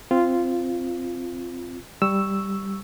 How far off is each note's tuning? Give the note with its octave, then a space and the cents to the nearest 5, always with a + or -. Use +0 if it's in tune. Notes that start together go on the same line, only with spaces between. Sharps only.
C4 +0 F4 -10
G3 +0 C#6 +0 E6 +0